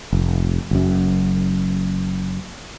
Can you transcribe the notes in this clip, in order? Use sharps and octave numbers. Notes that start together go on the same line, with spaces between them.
F1
F#1 F#2